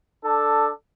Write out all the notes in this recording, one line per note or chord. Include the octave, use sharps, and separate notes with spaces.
D4 A4